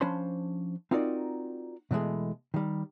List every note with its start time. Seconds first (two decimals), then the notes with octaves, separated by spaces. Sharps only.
0.01 F3 C#4 D4 C5 B5 C6
0.91 C4 D#4 F4 F#4 A#4 D5
1.91 B2 E3 F#3 G#3 A3
2.54 D#3 G3